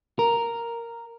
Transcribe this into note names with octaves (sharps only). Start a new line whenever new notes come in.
A#4